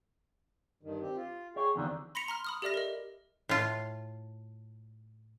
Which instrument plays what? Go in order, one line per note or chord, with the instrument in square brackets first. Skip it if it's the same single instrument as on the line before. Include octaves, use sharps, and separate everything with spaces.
[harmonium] G2 D#3
C4 G4
F4
[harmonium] G#4 G5 [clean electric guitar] C#5
[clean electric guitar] E2 D3 D#3 [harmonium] F3 G3 C4
[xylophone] B5 C6 A#6 B6 C#7 F7
A#5 C6 F6
B5 D#6 F6
G4 A4 D5 E5 F6 A#6
A#4 D#5
[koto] A2 F4